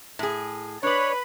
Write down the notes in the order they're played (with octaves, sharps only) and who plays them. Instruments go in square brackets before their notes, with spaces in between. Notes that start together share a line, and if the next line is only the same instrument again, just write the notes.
[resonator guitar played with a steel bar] A2 G#4
[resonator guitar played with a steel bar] D4 D5 [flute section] B4 B5 [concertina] C#5